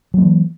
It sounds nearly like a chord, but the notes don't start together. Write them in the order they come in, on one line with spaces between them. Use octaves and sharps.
F#3 A#3 E3